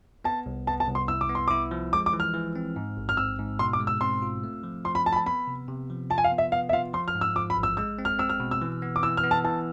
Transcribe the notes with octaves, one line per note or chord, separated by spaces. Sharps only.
B3 A5
C2
B3 A5
A5
C2
C6
E4 E6
D6
B3
C6
E4 D6
F3
G#3 D6
D6
E3
F6
E3
C4
G#2
A1
F6
C4 E6
G#2
B2 C6
D6
G#3
E6
C4 C6
F4
A3
F3
F3 C6
B5
F3 A5
B5
A5
B3 B5
C3
C3
F3
F4 A5
G#5
F5
B3
E5
B3 F5
E5
F4 F5
F3 C6
F6
G#2
E6
F3 D6
B5
A1
E6
G#3 E6
C4
F6
C4 E6
F6
B2
E6
E3
B3
D6
E3 E6
F6
B3
A5
E3 A5